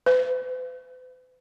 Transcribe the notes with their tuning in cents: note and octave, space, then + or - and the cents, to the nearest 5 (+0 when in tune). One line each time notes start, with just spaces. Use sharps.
B4 +45